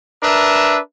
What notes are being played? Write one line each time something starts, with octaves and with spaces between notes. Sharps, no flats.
D4 A#4 B4 E5